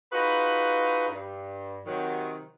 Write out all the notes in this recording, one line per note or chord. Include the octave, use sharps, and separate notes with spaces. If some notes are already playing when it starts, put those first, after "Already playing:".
D#4 F4 F#4 G#4 B4
G2
C3 D#3 F#3